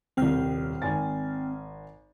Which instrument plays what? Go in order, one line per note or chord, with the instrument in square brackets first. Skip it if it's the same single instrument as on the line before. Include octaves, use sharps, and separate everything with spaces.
[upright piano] D#1 C2 [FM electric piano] C4 G5 F6
[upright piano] G#1 G#5 A6